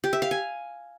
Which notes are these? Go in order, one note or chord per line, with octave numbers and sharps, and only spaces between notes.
G4
E5
F5
G#5